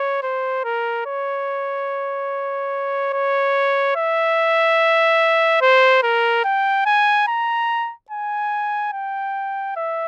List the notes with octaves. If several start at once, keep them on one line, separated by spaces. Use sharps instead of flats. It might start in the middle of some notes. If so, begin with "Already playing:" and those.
Already playing: C#5
C5
A#4
C#5
C#5
E5
C5
A#4
G5
G#5
A#5
G#5
G5
E5